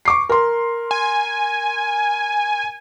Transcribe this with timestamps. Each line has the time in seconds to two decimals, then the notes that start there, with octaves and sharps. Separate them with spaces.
0.05 C#6 D6 C7
0.29 A#4 C6
0.91 G#5